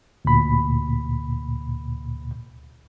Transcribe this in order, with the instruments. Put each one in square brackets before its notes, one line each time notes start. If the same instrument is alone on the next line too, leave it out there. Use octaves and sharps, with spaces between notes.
[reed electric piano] D2 A#2 B5